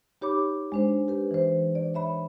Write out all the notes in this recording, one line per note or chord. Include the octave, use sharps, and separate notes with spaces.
D#4 G4 C#5 B5 D6
G#3 D4 C5
G4 B4
E3 C5
D5
C#5 E5 B5